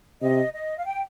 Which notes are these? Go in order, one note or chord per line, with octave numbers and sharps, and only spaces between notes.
C3 D#5
D#5
F5
G5